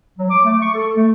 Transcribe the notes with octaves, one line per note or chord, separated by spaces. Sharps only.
F#3
D6
A3
C#6
A4
A3